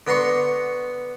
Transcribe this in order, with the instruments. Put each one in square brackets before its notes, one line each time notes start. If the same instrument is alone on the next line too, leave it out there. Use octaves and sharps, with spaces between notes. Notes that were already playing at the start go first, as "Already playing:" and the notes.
[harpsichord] D3 B3 A#5 C6 C#6